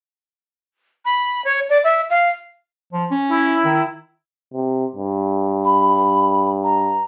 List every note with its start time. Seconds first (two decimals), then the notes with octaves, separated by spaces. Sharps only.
1.05 B5
1.44 C#5
1.69 D5
1.83 E5
2.09 F5
2.93 F3
3.11 C#4
3.29 E4
3.65 D#3
4.54 C3
4.96 G2
5.64 B5
6.64 A#5